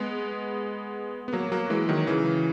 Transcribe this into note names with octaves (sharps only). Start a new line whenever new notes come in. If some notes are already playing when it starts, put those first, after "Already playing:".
Already playing: G#3 B3
B3
F#3 A#3
F#3 A#3
E3 G#3
D#3 F#3
C#3 E3